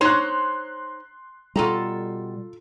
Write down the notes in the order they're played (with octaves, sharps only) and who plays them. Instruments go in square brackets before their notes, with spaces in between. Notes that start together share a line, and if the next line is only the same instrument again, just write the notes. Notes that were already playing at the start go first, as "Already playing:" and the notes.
[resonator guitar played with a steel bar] D#4 C5 C#5 [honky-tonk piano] C6 F#6
[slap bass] B2 G3 [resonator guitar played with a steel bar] F4 A4 A#5